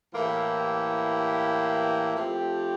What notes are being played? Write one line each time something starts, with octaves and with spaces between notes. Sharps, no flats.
A2 E3 A#3 E4 G4
F3 A3 C4 G4